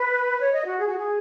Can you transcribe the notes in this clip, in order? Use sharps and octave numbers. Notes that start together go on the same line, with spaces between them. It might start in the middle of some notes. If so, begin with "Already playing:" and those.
Already playing: B4
C#5
D#5
F#4
G#4
F#4
G#4